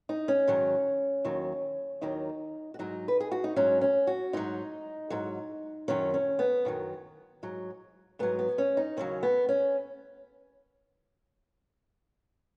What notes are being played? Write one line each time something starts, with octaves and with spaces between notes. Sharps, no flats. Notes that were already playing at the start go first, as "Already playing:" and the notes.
D#4
C#4
G#2 D#3 F#3
D#2 D#3 F#3
D#2 D#3 F#3 D#4
F#4
G#2 F#3 D#4
B4
G#4
F#4
D#4
G#2 F#3 C#4
C#4
F#4
G#2 F#3 D#4
G#2 F#3
F#2 D#3 F#3 C#4
C#4
B3
F#2 D#3 F#3
G#2 F#3
G#2 F#3 B3
B3
C#4
D#4
D#2 C#3 F#3 C#4
B3
C#4